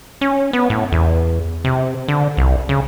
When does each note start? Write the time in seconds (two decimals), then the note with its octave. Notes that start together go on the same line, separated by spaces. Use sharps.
0.21 C#4
0.53 B3
0.70 A2
0.92 E2
1.65 C3
2.08 D3
2.37 C2
2.69 C#3